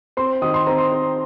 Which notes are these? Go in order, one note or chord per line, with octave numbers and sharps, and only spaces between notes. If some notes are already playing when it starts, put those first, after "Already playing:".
C4 C6
D#3 D#6
C6
C4 A#5
C6
C4